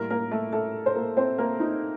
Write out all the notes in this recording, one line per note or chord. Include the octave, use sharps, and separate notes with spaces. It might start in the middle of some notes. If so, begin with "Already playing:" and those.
Already playing: A2 G3 A#3 A#4
A#3 A#4
A3 A4
A3 A4
C5
A#3 A#4
C4 C5
A#3 A#4
D#4